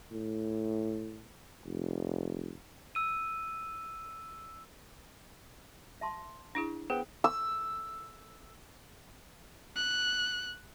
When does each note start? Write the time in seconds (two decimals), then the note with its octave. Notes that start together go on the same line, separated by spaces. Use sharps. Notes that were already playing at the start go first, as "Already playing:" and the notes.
0.12 A2
1.65 F1
2.95 E6 D#7
6.01 E5 A5 C6
6.55 D4 E4 G#4
6.90 B3 G#4 C5 G5
7.24 E6
9.76 F#6